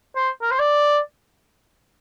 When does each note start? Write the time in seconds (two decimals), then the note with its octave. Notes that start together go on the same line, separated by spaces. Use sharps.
0.16 C5
0.42 A#4
0.51 C5
0.59 D5